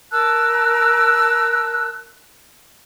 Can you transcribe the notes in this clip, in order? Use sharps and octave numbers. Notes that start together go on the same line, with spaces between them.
A#4 A5 E6 F#6